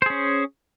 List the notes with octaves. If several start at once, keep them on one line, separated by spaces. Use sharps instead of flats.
C#4 G#4 C5